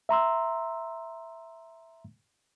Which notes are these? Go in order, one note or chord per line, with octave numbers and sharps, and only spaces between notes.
E5 A#5 C6 E6